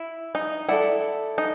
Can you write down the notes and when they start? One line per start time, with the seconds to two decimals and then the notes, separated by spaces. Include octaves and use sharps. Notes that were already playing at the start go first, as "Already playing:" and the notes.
Already playing: E4
0.35 D#4
0.68 E4 A4 D5 F#5
1.38 D#4